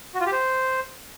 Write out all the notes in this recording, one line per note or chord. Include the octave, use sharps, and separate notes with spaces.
F#4
F4
G4
C5